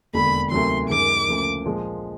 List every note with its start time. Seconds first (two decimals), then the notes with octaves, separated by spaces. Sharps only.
0.14 E1 D#2 D3 B5
0.51 D2 C3 D#3 F#3 C6
0.89 F#2 D#3 G#3 C#4 D6
1.27 D2 C#3 F3 A#3
1.65 A#1 A#2 F3 G#3